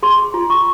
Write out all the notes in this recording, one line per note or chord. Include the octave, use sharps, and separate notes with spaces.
G#4 C6
F4
C#6